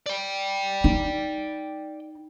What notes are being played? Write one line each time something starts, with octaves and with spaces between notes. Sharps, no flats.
D5 G5
D#4